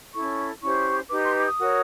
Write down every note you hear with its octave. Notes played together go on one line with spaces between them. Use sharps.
C#4 E4 A4 C#6
C#4 E4 G4 C5 C#6
D#4 G4 B4 D6
C6
D6
D#6
F#4 A#4 C#5